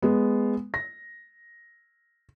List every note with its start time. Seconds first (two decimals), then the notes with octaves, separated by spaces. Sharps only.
0.02 G#3 B3
0.74 A#6